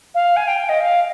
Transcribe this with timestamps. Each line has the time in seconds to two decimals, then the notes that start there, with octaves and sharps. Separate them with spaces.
0.15 F5
0.36 G#5
0.48 G5
0.69 D#5
0.81 F5